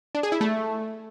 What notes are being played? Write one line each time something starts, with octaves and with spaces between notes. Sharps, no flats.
D4
G#4
E4
A3